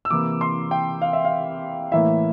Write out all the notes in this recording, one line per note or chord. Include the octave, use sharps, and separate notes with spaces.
E6
C3 E3 A#3 E4 D6
C6
G5
F5
E5
F5
A2 E3 A#3 E4 E5